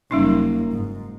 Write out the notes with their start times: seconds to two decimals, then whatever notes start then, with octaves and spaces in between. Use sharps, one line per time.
0.11 F#1 G3 A#3 C#4 D#4
0.72 G#2